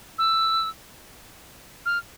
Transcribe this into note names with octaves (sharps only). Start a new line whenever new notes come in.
E6
F6